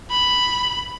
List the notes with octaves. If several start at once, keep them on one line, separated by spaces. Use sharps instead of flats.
B5